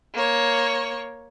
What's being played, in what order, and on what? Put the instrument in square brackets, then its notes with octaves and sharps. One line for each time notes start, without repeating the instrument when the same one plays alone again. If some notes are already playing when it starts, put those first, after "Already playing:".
[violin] A#3 C#5